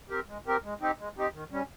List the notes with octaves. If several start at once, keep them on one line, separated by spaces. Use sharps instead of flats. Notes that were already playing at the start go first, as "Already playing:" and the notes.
C4 G4 A#4
G#3
C4 G4 A#4
G#3
C4 D#4 G4
G#3
C4 D#4 G4
D#3
G3 C#4